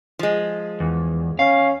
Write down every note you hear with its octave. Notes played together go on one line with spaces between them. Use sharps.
F3 G#3
E2
C#4 F5